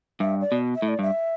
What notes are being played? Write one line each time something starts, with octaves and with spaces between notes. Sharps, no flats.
G2 E5
D5
B2
E5
A2
D5
G2 E5